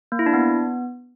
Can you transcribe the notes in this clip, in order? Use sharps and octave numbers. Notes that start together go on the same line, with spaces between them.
A#3
E4
D4
B3